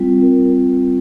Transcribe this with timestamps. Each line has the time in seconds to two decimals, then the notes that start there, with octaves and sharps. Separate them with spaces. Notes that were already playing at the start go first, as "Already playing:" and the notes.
Already playing: G3 C4 F4
0.22 A#4